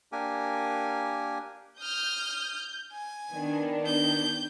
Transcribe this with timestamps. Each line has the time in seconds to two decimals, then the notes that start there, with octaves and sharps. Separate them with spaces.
0.12 A#3 D4 G4 A#4 G#5
1.80 D#6 F6 G6
2.92 G#5
3.33 D#3 B3 D4
3.86 G6